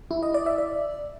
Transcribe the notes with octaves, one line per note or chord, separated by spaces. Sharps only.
E4
D#5
D5
E5
D5